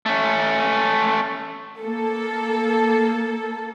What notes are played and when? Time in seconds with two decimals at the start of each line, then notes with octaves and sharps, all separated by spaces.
0.06 A3 C#4
1.79 A#3 A4